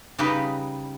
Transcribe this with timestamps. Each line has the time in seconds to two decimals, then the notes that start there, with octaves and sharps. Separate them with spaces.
0.18 C#3 G3 D#4 G4 B4